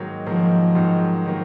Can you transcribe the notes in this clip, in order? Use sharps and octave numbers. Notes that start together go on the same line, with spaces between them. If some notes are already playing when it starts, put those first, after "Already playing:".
Already playing: G#2 D#3 F#3 A#3
G#2 D#3 F3 F#3 A#3
G#2 D#3 F#3 A#3
D#3 F#3 A#3